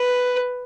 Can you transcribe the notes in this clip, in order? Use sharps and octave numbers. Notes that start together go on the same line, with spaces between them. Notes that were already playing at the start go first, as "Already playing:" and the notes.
Already playing: B4